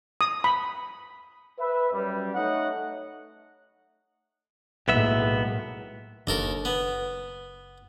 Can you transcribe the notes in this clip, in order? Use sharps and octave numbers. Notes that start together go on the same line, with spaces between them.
D#6
B5
B4 E5
F#2 G3
A3 D#4 C#5 D#5 F#5
B1 A2 G#3 A#3 B3 E5
F#1 D#2 D4 A4 A#4
B3